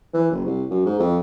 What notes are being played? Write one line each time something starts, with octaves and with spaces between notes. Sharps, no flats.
E3
F#1
C2
F#2
G#2
F2